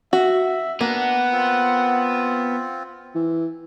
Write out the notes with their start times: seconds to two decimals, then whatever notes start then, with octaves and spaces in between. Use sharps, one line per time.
0.13 F#4 E5
0.81 A#3 B3 D4 F#5
1.32 C4 F4
3.15 E3